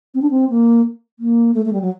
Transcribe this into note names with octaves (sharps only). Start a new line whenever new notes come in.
C4
D4
C4
A#3
A#3
A3
A3
G3
F#3